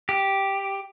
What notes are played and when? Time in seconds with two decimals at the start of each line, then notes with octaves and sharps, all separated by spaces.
0.09 G4